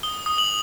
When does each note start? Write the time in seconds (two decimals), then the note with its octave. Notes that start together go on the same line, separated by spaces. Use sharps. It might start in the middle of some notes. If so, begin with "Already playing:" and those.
0.03 D#6 G7
0.26 D#6
0.38 F#7